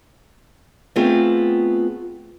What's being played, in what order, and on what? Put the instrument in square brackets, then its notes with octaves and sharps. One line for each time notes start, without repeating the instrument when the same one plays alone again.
[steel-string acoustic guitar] A3 B3 C4 F4 G#4